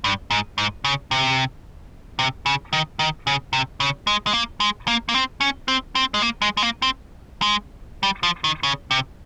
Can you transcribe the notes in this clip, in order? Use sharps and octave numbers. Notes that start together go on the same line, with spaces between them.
G2
G#2
G#2
C#3
C3
C3
C#3
D#3
D#3
C#3
C3
C#3
G#3
G#3
A#3
G#3
A#3
A#3
C4
C#4
C4
C4
G#3
A#3
G#3
G#3
A#3
C4
G#3
G3
F3
D#3
C#3
C3